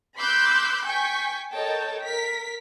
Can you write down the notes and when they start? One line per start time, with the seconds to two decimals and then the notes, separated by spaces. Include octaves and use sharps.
0.18 B5 C6 D6 E6 F#6 G6
0.86 G5 G#5 C#6 G6 B6
1.53 A4 A#4 C#5 D#5 G5 A5
2.01 A#4 B6